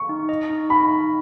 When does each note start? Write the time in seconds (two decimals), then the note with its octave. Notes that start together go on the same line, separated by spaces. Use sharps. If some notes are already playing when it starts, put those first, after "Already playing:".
Already playing: C#6
0.09 D#4
0.29 D#5
0.49 D#4
0.69 D#4 B5
0.90 D#4